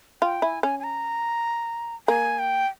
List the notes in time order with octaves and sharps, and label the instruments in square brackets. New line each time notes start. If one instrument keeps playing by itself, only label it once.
[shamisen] F4 [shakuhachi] G5
[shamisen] E4 [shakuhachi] G#5
[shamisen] C#4 [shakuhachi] G#5
[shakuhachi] G#5
A#5
[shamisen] A#3 [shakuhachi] G#5
[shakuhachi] G5